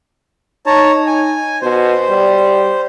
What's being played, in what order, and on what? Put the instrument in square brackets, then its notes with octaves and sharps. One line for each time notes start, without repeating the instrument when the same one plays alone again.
[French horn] D#4 [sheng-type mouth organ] C#5 A5 A#5
[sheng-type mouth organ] G#5
[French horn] B2 [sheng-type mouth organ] C5
[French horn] G3